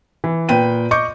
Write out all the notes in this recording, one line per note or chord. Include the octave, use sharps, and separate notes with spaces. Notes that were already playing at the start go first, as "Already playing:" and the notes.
E3
A#2 B4 G5 D#7
D#5 C#6 D6 G6 C#7